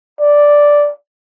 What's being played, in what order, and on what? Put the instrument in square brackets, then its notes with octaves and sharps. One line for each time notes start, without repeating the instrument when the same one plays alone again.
[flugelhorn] D5